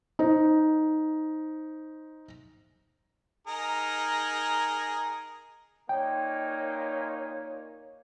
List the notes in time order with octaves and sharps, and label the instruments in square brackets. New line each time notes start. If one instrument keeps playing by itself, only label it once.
[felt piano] D#4 C5
[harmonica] D#4 G#4 A#4
[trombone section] A#2 A#3 D#4 [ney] C#5 [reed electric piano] G5